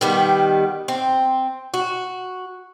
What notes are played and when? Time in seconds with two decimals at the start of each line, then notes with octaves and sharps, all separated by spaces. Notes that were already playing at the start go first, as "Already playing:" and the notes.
0.01 D#3 G3 B3
0.88 C4
1.74 F#4